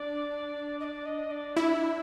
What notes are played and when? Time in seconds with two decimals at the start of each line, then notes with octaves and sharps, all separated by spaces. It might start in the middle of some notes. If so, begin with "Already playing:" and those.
Already playing: D4 D5
0.80 D#5
0.84 D5
1.05 D#5
1.31 D5
1.56 E4 E5